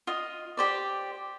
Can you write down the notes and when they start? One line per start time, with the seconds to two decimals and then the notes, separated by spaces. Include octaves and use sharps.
0.07 F4 D#5
0.57 G4 C5 D5